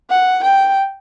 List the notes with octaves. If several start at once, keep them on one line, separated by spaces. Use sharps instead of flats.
F#5
G5